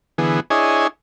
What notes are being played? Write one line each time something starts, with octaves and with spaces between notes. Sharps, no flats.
D3 E3 B3 G#4
D4 E4 G#4 C#5 D#5 G#5